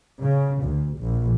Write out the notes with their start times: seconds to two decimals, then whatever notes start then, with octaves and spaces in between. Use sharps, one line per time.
0.21 C#3
0.63 D2
0.99 A#1